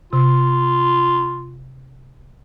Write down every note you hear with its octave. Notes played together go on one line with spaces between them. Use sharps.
C3 F4